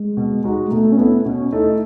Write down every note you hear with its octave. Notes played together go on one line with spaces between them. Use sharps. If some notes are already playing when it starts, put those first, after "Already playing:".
Already playing: G#3
B2
G#3 D#4 F#4
G#3
B2 A3
C#4
A3 B3 E4
B2 C#4
A3 D#4 E4